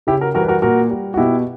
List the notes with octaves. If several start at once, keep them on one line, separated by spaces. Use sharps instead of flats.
C#3 E4 G4
F#4 A#4
E3 G3 F#4 A#4
B4
F#4 A#4
A#2 F#4 A#4
G3
F#4
B2 E4 G4